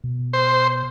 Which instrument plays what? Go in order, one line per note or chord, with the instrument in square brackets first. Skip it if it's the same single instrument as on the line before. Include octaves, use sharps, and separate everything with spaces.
[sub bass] B2
[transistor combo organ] C5